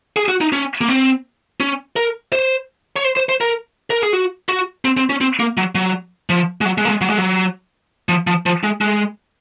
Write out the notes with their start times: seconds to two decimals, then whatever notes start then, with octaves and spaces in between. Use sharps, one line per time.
0.16 G#4
0.28 F#4
0.41 D#4
0.53 C#4
0.81 A#3
0.89 C4
1.60 C#4
1.96 A#4
2.33 C5
2.96 C#5
3.04 C5
3.17 C5
3.29 C5
3.41 A#4
3.90 A#4
4.02 G#4
4.13 F#4
4.49 F#4
4.85 C4
4.97 C4
5.10 C#4
5.21 C4
5.40 A#3
5.57 F#3
5.75 F#3
6.30 F3
6.61 G#3
6.65 F#3
6.78 G#3
6.85 A#3
6.89 G#3
7.01 F#3
7.10 G#3
7.18 F#3
8.09 F3
8.27 F3
8.46 F3
8.64 G#3
8.81 G#3